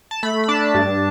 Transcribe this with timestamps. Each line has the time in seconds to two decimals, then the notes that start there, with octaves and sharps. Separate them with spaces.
0.11 A5
0.23 A3 B5
0.44 B5
0.48 D4 A5
0.74 G2